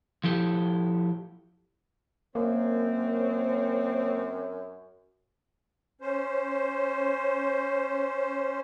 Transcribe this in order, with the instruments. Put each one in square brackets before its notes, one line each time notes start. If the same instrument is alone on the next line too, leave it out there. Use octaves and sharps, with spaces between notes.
[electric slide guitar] F3 E4 G4 A4
[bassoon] F#2 [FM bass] A#3 [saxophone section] C4 C#5
[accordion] C#4 C5